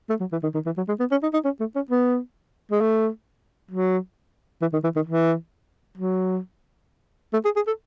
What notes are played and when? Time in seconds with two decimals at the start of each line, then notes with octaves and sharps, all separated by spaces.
0.09 A3
0.20 F#3
0.32 E3
0.43 D#3
0.54 D#3
0.66 E3
0.77 F#3
0.88 G#3
1.00 B3
1.11 C#4
1.23 D#4
1.33 D#4
1.45 C#4
1.60 A3
1.75 C#4
1.90 B3
2.71 G#3
2.81 A3
3.71 F#3
4.61 E3
4.73 D#3
4.84 E3
4.96 D#3
5.07 E3
5.97 F#3
7.33 A3
7.45 G#4
7.56 G#4
7.67 A4